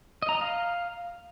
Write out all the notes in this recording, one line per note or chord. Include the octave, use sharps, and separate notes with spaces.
D#5
A#5
D#5
F5